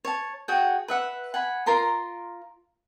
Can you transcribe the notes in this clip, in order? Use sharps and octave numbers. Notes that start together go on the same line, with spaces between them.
C#5 A5
F#4 G#4 F#5 G5
B4 E5 F#5
F#5 G#5 B5
F4 A#4 A#5 C6